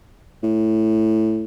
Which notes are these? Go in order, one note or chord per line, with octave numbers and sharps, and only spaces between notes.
A2